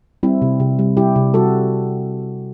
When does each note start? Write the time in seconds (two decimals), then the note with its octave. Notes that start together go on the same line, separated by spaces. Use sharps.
0.23 G3 C4 E4
0.42 C3
0.60 C3
0.79 G3
0.97 G3 E4 G4
1.16 C3
1.34 G3 F#4 A4